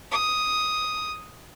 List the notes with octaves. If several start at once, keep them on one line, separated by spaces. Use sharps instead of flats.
D#6